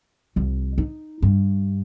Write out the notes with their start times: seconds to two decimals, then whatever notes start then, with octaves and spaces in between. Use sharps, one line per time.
0.36 C2 F2
0.78 D#4
1.22 G2